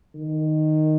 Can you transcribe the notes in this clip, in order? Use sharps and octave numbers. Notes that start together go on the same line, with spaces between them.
D#3